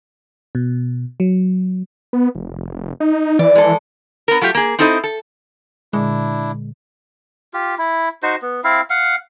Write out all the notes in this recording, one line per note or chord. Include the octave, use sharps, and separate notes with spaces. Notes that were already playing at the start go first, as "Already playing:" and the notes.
B2
F#3
B3
F1
D#4
E3 D5
G#3 A4
B3 A#4
F#3 A3 F4 G4
A#3 G#4
C4 D#4 E4 A4 C5 D#5
A4
A#2 D3 G#3 D4 E4
F4 G4
E4
D#4 F#4 C5
B3
C4 E4 F5
F5 F#5